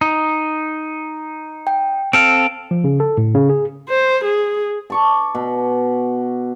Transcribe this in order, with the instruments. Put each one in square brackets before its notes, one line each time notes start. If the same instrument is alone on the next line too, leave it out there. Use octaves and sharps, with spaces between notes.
[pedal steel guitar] D#4
[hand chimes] G5
[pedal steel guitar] C4 A4 F5 [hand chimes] D7
[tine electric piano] F3
C#3
A4
A2
C#3
G#4
[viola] C5
G#4
[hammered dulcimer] A5 C#6 D6
B2